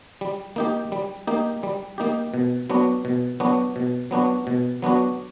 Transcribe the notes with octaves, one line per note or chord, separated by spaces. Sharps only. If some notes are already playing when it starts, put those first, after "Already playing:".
G3
A#3 D#4 G4
G3
A#3 D#4 G4
G3
A#3 D#4 G4
B2
F#3 B3 D4 F#4
B2
F#3 B3 D4 F#4
B2
F#3 B3 D4 F#4
B2
F#3 B3 D4 F#4